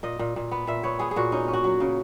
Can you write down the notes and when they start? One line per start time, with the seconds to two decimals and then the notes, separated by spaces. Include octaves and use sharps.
0.03 A#2 D#5
0.19 A#2
0.36 A#2
0.51 B3
0.67 A#2 E5
0.83 B3 C#5
0.99 B3 G#4
1.11 G#4
1.16 A#2 F#4
1.32 C#4 D#4
1.48 C#4
1.53 F#4
1.64 F#3
1.80 C#3